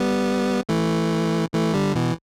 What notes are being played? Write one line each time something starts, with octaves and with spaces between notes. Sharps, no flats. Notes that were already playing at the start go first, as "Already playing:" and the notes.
Already playing: G3 B3
E3 A3
E3 A3
D3 G3
B2 E3